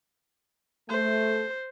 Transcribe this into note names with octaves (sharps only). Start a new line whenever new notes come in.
A3 C5